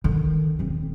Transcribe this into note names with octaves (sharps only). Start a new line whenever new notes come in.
D3 D#3
D#1 C4